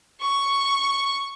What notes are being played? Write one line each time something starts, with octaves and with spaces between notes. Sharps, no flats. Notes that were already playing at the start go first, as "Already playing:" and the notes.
C#6